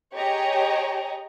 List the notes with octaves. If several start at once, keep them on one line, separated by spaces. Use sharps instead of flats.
G4 G#4 C#5 D#5 A#5